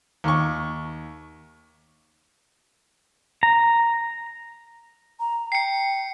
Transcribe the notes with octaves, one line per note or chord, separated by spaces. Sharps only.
D#2 C#6
A#5
A#5
G5 C7 C#7